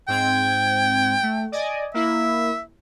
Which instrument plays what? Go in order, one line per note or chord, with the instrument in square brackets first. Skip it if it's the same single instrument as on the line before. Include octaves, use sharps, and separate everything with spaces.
[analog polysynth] G#2 C4 G#6 [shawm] G5
[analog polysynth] A3
D5 D#5 G#5
[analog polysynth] A#3 E4 [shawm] E5